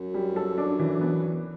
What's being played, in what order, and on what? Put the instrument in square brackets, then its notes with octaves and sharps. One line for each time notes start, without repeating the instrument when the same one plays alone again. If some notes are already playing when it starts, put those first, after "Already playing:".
Already playing: [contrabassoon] F#2
[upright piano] G3
A4
D4
E3
B3